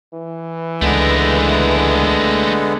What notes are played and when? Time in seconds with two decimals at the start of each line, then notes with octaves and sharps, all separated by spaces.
0.13 E3
0.82 C#2 D3 G#3 A3 B3 A#4